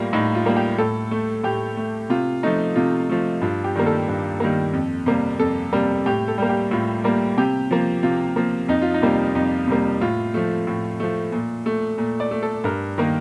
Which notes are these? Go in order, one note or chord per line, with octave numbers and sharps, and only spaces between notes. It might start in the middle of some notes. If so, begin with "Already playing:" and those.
Already playing: A2 G3 A#3 F4
A2 D#4
F4
G3 A#3
G4
A2 A4
A3
A2 G4
A3
C3 F4
F3 A3 D#4
C3 F4
F3 A3
G2 F4
G4
D#3 G3 A#3
A4
G2
D#3 G3 A#3
F2
C3 G3 A#3
F2 A4
C3 G3 A#3
A2 G4
A4
G3 A#3
G4
A2 F4
G3 A#3
C3 G4
F3 A#3
C3 F4
F3 A#3
F2 D#4
F4
D#4
C3 G3 A#3
F2 D#4
C3 G3 A#3
A2 F4
F3 A3
A2
F3 A3
A#2
A3
A#2
D5
A3
A4
G2 A#4
D#3 A#3